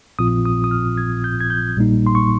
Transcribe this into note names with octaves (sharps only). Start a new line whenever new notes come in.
A#1 A#2 F3 C4 F4 D#6
D#6
D#6
F6
G#6
G6
G#6
G6
A#1 A#2 G3 A#3 D#4
C6
C#6